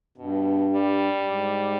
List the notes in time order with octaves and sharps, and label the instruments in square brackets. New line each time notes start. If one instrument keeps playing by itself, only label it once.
[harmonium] G2 [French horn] B2
[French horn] G3
[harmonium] G2
G#2